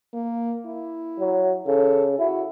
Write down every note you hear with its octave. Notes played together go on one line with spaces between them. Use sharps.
A#3
E4
F#3
C#3 A4
E4 F#4